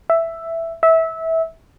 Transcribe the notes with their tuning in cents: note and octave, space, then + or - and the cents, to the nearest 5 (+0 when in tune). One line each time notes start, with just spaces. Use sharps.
E5 +5
E5 -20